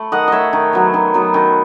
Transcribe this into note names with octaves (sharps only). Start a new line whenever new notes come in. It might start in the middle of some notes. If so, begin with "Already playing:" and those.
Already playing: A3 B5
D#3 D#5 F#5
A3 C#5 D#5 E5
D#3
F#3 B3
D#3
F#3 B3
D#3